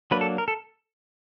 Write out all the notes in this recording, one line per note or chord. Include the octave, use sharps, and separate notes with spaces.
F#3 A#3 D4 B4
A4
A#4
A4